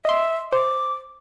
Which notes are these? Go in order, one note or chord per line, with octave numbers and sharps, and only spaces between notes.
D#5 E5 C6
C5 D6